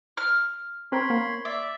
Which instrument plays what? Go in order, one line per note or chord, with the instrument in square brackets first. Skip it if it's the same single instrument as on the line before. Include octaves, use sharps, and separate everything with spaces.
[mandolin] F6
[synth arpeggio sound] C4 A#4 [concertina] C#5 B5 C6
[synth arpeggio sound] A#3
[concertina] D5 [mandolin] E5